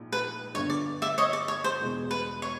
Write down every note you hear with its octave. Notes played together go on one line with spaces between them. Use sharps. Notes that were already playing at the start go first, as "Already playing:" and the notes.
Already playing: A#1 G#2
B4
G1 G2 D3 C#5
D5
D5 E5
C#5 D#5
D5
C#5
C5
E1 E2 B2 G#3
B4
C#5